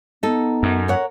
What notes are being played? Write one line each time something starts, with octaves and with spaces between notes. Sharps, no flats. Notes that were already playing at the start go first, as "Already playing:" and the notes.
B3 D#4 A4
F#2
A#4 C#5 F#5